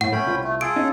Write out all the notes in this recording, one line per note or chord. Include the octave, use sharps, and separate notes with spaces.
A2 F#5
A3 C#4 G5 B5
C2 F4
A3
F4 G#4 A4 D7
C#4 D#4